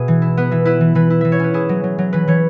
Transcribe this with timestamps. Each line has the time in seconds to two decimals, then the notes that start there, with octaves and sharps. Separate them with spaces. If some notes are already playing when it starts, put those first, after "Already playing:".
Already playing: B2 G#4 B4 E5
0.08 E3
0.22 E4
0.37 B3 B4
0.51 E3 E5
0.65 E4 B4
0.81 E3
0.95 E3 B4
1.10 E4
1.21 E3 E5
1.32 C#5
1.40 C#4 B4
1.54 E4 G#4
1.69 F#3
1.84 F#3
1.98 F#3
2.13 E3 B4
2.28 E3 C#5